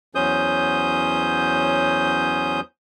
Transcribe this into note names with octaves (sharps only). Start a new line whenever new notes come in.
E2 F#3 C#4 C5 D#6 G6